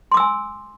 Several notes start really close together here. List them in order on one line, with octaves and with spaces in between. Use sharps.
C6 D6 E6 G#5